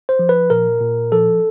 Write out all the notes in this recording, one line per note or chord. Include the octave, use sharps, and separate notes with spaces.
C5
F3
B4
A#2 A#4
A#2
F3 A4